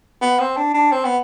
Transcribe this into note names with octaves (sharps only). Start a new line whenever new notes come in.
B3
C4
D4
D4
C4
B3